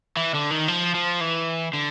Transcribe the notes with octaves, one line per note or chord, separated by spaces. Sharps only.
E3
D3
D#3
F3
F3
E3
D3